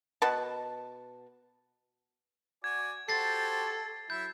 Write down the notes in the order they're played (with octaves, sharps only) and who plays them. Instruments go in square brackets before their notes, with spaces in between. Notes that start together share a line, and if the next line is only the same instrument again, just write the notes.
[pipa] B2 B4 A5
[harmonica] F#4 D5 G#5 [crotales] G#6
[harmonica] F#4 G4 C5 [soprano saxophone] A4 [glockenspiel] A6 C7
[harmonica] F#3 E4 E5 [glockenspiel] G6